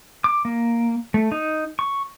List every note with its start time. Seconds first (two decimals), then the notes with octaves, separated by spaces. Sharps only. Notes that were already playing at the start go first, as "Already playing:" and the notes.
0.24 D6
0.45 A#3
1.14 A3
1.32 D#4
1.79 C#6